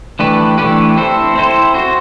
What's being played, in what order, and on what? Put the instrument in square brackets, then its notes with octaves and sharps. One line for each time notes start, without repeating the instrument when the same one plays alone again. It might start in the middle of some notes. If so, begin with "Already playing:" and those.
[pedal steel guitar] E3 A3 D4 G4 B4
E3 A3 D4 G4 B4
C4 E4 A4 C5
C4 E4 A4 C5
C4 F#4 C5